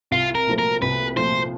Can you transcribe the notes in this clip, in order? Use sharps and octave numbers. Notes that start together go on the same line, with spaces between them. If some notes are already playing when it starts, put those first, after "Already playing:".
C2 F4
A#4
A#2 F3 A3
A#4
C2 B4
A#2 F3 A3 C5